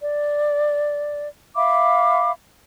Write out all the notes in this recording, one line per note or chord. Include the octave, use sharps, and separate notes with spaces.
D5
E5 F5 B5 D6